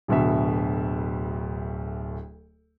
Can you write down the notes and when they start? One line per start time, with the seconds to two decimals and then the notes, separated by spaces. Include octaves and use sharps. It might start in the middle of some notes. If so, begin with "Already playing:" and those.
0.08 D1 D2 B2 E5